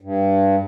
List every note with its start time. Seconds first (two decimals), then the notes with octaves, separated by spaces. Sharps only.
0.02 G2